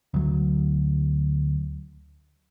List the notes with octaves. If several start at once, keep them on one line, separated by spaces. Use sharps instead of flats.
D2 F#3